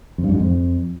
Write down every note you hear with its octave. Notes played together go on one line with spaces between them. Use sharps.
F2
G2
F#2
G#2
F2